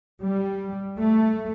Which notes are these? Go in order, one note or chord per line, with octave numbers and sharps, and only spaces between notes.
G3
A3